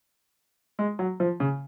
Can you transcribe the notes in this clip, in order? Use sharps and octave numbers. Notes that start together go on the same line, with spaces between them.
G#3
F#3
F3
C#3